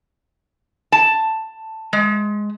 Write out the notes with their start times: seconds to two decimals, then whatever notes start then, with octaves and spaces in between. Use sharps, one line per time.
0.92 A5
1.93 G#3